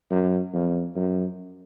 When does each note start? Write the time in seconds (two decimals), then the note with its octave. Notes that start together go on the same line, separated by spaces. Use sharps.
0.11 F#2
0.54 F2
0.96 F#2